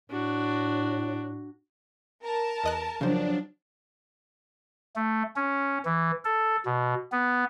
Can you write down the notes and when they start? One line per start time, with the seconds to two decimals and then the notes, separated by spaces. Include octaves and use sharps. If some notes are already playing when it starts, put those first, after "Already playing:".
0.10 A2 D4 F#4
2.23 A#4 A5
2.64 E2 D#5 F#6
3.01 C#3 F3 F#3 D4 C5
4.96 A3
5.36 C#4
5.85 E3
6.25 A4
6.66 B2
7.12 B3